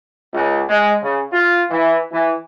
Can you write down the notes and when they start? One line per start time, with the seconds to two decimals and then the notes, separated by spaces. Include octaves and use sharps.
0.34 C#2
0.69 G#3
1.03 C#3
1.33 F4
1.70 E3
2.12 E3